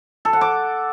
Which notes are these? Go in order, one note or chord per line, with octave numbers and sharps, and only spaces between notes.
A4
F#5
D6